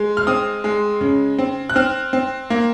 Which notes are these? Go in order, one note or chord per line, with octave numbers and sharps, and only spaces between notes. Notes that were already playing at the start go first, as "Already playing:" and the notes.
Already playing: G#3
F6
C4 D#6
G#3
C#3
C4
F#6
C4 F6
C4
A#3